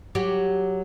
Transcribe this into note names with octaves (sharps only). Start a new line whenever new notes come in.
F#3 G4